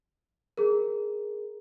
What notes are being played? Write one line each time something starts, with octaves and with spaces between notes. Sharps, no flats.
G#4 A#4